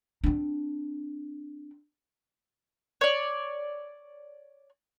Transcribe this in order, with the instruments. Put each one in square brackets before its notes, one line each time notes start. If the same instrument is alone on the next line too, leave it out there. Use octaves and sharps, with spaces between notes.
[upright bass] C4 D4
[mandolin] C#5 D5